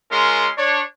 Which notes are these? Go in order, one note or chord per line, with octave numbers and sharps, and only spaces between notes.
G#3 C#4 F4 A#4 C6
D4 C#5